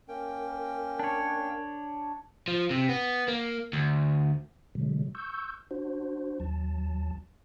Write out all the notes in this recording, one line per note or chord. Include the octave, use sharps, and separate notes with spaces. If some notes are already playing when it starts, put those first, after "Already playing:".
A#3 C#4 A#4 G5
D4 C#5
F3
C3
B3
A#3
D2
B2 D3 F#3 G#3
C#6 E6 G6
D4 F#4 C5
D#2 F#3 A5